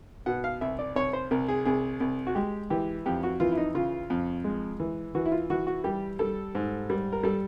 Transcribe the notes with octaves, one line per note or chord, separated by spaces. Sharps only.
B2 F#5
F5
C2 E5
D5
C2 C#5
C5
C2 A#4
G#4
C2 G#4
C2
F#4
G#3 G4
E3 G4
F2 G4
F#4
E3 F4
E4
D#4
C#3 F4
F2
G#3
E3
E3 F#4
E4
F4
E3 F#4
F#4
G3 G4
G3 A4
G#2
G3
A#4
G3 A4